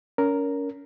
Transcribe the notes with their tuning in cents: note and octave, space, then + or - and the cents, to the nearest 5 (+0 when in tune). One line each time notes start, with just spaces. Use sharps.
C#4 +25 A#4 +0